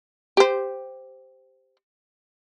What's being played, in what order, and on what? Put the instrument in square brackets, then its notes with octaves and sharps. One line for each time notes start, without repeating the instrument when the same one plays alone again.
[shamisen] G4 C5